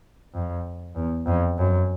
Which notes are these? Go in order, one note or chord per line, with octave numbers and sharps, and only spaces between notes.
F2
E2
F2
F#2